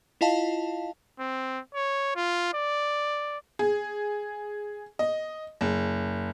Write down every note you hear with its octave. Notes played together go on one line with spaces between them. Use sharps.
E4 F4 D#5 F5 A5
C4
C#5
F4
D5
G#4
D#5
F#1